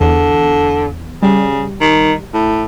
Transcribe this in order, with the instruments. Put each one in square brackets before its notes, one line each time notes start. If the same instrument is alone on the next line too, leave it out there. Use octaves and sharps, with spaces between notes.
[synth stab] E2 [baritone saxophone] D3
[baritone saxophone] C#3 [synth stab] G3
[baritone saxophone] D#3
A2